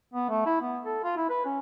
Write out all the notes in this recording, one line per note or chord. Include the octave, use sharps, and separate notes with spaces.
B3
A3
E4
B3
A4
F4
E4
B4
C#4